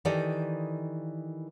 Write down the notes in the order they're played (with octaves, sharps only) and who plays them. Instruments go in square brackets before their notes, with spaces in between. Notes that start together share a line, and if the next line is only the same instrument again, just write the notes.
[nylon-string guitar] D#3 E3 G4 A4 D5 D#5